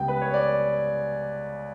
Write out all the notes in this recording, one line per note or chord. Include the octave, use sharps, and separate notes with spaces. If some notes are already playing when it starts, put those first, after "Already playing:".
Already playing: C#2 C#3 G3 B3 G5
B4
C#5
D5